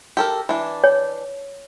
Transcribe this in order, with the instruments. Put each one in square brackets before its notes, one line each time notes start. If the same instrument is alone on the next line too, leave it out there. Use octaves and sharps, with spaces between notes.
[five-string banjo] G4 A4 A#4
E3 D4
[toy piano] C#5